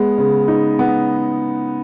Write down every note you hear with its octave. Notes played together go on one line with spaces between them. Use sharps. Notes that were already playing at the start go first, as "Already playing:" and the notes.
Already playing: G#3 B3
C#3
D#4
B3